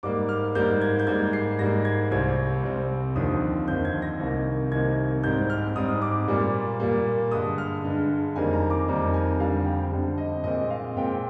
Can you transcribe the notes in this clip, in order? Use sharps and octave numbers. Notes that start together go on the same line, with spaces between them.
G#2 G3 A#3 D6
F6
G#2 G3 A#3 G6
G#6
G6
G#2 G3 A#3 G#6
C7
G#2 G3 A#3 A#6
G#6
C2 C3 G3 C4 G#6
C2 C3 G3 C4
D#2 D3 F3 C4 D#6
D#2 D3 F3 C4 G6
G#6
A#6
C2 C3 D#3 A#3
C2 C3 D#3 A#3 G#6
G#2 G3 C4 G6
F6
G#2 G3 C4 D#6
D6
A#2 G3 A#3
A#2 G3 A#3
G2 D3 G#3 D#6
F6
G2 D3 G#3
F2 D#3 G3 A#3 G#5
A#5
D6
F2 D#3 G3 A#3 A#5
G#5
F2 D3 G3 F5
G5
F2 D3 G3
D#5
A#2 G#3 C4 D#5
F5
A#2 G#3 C4 G5